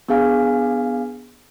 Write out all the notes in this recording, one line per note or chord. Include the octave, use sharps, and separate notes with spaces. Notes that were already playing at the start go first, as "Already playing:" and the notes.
B3 D4 G#4 F5 G#5